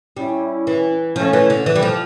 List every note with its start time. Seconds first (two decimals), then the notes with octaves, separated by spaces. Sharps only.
0.17 G3 C#4 E4
0.67 E3
1.16 F3 A3 C#4
1.33 E3
1.50 D3
1.66 E3
1.76 G3
1.82 F3